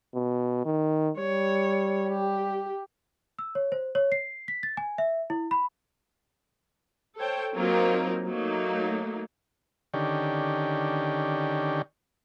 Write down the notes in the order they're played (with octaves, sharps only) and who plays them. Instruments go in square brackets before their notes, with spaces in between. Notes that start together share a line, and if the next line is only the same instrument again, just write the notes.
[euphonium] B2
D#3
[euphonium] G3 [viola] C#5
[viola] G4
[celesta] E6
C#5
C5
C#5
C7
B6
A6
G#5
E5
E4
B5
[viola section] A4 C5 C#5 G5
F#3 A#3 C4 D#4 F4 A#4
F#3 A3 A#3 D#4
[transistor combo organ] D3 D#3 C#4 G4